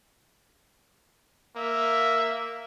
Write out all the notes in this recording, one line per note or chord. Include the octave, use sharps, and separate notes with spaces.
A#3 E5